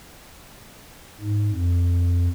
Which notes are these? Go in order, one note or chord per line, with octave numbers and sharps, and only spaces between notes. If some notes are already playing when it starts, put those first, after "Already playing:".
G#2
F2